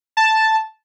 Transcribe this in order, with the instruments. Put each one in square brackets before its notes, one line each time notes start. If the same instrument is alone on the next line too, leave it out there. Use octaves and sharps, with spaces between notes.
[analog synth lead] A5